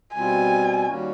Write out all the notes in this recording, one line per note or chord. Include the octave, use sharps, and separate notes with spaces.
B2 G3 C4 F4 G#5
D#3 G3 A#3 C#4 F#4